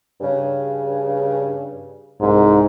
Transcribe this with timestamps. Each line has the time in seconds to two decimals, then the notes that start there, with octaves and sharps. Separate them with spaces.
0.21 G2 C#3
2.21 C2 G#2